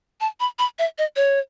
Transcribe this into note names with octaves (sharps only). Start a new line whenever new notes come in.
A5
B5
B5
E5
D#5
C#5